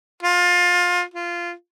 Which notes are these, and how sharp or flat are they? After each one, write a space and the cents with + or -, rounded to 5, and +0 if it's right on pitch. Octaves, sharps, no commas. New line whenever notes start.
F4 +25
F4 -15